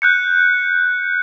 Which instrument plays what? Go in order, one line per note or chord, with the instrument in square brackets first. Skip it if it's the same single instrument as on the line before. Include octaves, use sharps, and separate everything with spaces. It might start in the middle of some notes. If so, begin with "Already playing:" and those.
[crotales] F#6 G6 C#7